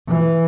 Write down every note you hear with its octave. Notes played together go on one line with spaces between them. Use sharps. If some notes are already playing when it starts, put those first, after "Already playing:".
E3